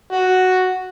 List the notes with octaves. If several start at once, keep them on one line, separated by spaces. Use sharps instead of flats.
F#4